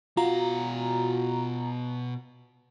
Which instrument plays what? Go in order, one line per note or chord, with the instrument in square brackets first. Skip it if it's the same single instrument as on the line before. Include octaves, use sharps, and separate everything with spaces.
[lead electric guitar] B2 F5 [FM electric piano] F4 F#4 A#5